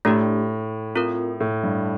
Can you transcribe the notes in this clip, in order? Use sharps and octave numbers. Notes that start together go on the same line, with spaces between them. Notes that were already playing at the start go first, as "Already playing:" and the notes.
A2 A3 D4 G4
C4 F4 A#4
A2
G2